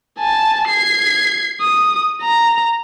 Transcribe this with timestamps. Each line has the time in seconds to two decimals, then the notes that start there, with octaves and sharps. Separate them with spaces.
0.18 G#5 A5
0.68 G#6 C7
1.61 D#6
2.21 A#5